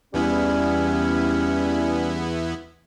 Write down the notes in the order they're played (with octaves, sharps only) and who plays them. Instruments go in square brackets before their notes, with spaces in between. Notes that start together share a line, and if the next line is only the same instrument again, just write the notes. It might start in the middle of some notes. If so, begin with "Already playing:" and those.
[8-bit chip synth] E2 B3 E4 [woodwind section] G3 C#4